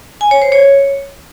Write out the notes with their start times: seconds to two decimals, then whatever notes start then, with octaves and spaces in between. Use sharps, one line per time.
0.21 G#5
0.31 C#5
0.42 C5
0.52 C#5